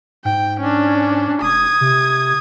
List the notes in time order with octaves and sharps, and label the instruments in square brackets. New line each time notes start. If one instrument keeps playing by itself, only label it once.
[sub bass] G#2 [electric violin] G5
[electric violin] C#4 D4
[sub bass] F1 [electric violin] D#6 G#6
[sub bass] C3